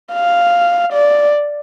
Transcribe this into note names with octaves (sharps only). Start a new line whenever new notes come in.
F5
D5